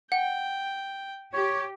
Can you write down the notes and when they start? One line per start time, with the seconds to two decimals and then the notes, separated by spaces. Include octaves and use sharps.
0.12 F#5 G5
1.33 G4 C#5